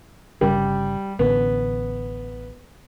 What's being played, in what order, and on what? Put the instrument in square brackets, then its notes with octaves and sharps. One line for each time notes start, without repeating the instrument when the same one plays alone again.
[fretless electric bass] G1 C#3 [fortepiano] G3
[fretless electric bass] A1 D3 [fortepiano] B3